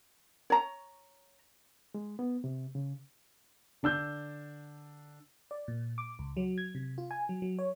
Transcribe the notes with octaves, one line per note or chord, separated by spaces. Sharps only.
C#5 A#5
G#3
B3
C3
C#3
D3 D4 E6 G6
D5
A#2
D6
C#2
F#3
G#6
C3
F4
G#5
F#3
F#3
C#5